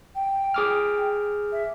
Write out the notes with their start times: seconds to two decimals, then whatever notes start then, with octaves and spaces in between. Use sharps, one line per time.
0.15 G5
0.54 G#4 D6 F6
1.52 E5